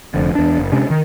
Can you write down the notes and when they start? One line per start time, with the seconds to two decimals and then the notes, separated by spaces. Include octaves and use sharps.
0.14 F1 F2 D3
0.35 E2 D4
0.58 F#1
0.72 C3 G#3 C#4 D4
0.90 D#3